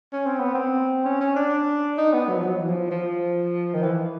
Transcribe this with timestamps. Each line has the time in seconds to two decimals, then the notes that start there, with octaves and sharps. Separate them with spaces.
0.13 C#4
0.26 C4
0.40 B3
0.55 C4
1.05 C#4
1.20 C#4
1.36 D4
1.98 D#4
2.13 B3
2.29 F#3
2.38 F3
2.44 F#3
2.60 E3
2.68 F3
2.91 F3
3.74 D#3
3.83 E3